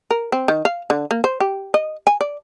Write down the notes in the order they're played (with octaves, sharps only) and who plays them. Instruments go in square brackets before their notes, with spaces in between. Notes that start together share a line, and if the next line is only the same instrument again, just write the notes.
[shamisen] A#4
C4
D#3
F5
D3
A#3
C5
G4
D#5
G#5
D5